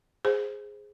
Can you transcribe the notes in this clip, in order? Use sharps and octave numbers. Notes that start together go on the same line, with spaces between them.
G#4 C5